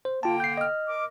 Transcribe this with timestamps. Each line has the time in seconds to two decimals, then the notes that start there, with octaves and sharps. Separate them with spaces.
0.05 C5
0.23 D3 A#3 F4 G5 A5
0.40 G6 C7
0.58 D#5 F6
0.88 A#4 D6